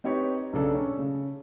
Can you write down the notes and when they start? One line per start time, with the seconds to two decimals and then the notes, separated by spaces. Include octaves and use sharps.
0.04 C4 D#4 G4 B4 C#5
0.53 B1 C#3 D4 A4
0.75 C#4
0.99 C#3